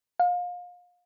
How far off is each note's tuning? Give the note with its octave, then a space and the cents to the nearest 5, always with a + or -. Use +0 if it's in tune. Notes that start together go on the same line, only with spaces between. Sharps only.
F5 +30